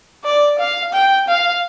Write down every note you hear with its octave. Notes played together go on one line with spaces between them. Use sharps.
D5
F5
G5
F5